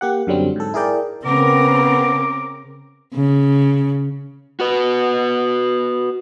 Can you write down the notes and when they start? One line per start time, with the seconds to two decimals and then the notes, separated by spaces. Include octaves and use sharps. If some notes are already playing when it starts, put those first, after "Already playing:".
0.01 A#3 G4 F#5
0.27 F#2 D3 F#3 G3 C4
0.56 G#2 A4
0.74 E4 G#4 A#4 D5 G5
1.25 C#3 B3 C4 A#4 D6
3.14 C#3
4.60 F#4 B4